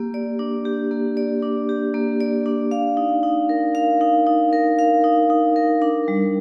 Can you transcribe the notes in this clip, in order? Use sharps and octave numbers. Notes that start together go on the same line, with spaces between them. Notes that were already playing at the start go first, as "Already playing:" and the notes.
Already playing: A#3 G4
D5
D4
G4
A#3
D5
D4
G4
A#3
D5
D4
F5
D#4
D#4
A#4
F5
D#4
D#4
A#4
F5
D#4
D#4
A#4
D4
G3